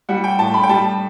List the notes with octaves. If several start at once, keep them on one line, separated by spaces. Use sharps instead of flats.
G3 F#5
G5
A2 A5
B5
G5
G3 A5